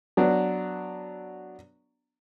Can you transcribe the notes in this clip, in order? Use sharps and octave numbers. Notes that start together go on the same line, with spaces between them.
F#3 B3 D4